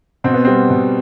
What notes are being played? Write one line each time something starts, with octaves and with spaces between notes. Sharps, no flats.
B2 C4
B3
G3 C4
B2